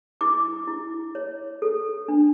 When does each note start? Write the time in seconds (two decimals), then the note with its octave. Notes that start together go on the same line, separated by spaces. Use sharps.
0.21 E4 D6
0.68 E4
1.15 C#5
1.62 A4
2.08 D4